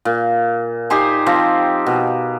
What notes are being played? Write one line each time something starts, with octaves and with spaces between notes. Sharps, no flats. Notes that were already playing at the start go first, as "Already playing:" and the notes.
A#2
D#4 G4 C5 G#5
F3 C4
B2